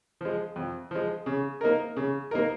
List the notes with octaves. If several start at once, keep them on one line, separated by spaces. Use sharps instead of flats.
F3 G#3
F2
F3 G#3
C#3
A#3 D#4 A#4
C#3
A#3 D#4 A#4